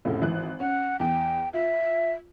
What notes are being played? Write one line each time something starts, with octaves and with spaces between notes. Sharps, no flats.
F1 C#2 A2
G#1 E3 F#6
C#4 F#5
E2 G5
F4 E5